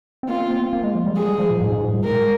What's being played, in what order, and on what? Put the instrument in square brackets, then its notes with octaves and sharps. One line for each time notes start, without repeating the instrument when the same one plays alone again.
[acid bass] C4
[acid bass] A#3 [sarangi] F4
[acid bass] C4
C4
A#3
A#3
G#3
F3
G3
[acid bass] G#3 [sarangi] G#4
[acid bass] G3
F3
A#2
G#2
G#2
A#2
G3
[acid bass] G#3 [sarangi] A#4